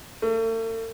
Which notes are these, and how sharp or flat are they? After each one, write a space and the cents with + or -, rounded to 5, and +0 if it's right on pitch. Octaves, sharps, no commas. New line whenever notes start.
A3 +45